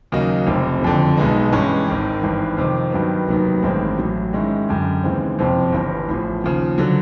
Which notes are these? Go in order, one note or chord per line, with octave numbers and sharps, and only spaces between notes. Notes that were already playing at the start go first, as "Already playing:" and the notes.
D#2 C#3 F#3 A#3 D#4
F1 F2 C3
F#1 F2 D3
B1 B2 G#3 B3 D#4
G2 E3 G#3 C#4
G#1 G#2 D#3
G#1 G2 E3
F2 C3 D#3
G2 D#3 F#3 B3
F1 D#2 D#3 F#3 B3
A1 G2 D#3 G#3 C4
A1 A2 F#3
G#2 D#3 G#3 C#4 E4
F#2 D3 G3
D#2 C#3 E3 G#3 C4
F#1 F2 C3 F3
G1 G2 E3
A1 A2 F3
D#2 C#3 F3
D3 F#3